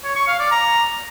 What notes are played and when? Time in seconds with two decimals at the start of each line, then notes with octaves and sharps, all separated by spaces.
0.04 C#5
0.16 C#6
0.28 F5
0.39 D5
0.51 A#5